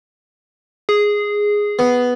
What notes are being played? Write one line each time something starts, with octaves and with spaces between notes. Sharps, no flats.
G#4
B3